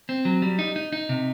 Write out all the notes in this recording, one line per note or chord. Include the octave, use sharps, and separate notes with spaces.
C4
F#3
G3
D#4
D#4
D#4
C3